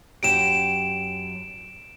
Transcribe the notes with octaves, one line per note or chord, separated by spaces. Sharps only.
F#2 F#4 G4 D7 E7